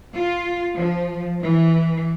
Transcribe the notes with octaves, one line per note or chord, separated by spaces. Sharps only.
F4
F3
E3